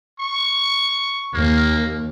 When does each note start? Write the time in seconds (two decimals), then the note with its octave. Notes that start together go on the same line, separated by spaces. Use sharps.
0.20 C#6
1.34 D#2 A#3